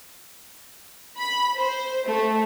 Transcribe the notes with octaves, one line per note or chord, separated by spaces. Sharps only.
B5
C5
A3